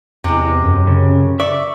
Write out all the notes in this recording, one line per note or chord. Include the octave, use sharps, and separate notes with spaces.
E2 C3 G#3
F#2
C#3
D5 E5 C#6